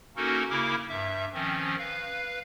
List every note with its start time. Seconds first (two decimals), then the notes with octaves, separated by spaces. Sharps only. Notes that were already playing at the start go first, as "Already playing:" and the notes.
0.16 A#3 C#4 D#4 F#4 A4 A#4
0.50 C#3 A#3 E4 A#4 D6
0.89 G2 E5
1.34 D#3 F3 C4 C#4
1.78 B4 F5